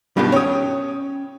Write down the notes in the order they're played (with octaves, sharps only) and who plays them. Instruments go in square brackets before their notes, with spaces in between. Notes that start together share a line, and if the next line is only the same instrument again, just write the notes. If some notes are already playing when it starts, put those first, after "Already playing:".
[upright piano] G2 B2 D#3 [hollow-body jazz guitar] G3 F4 G4
[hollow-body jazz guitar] C#4 [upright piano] C#5 G5 D#6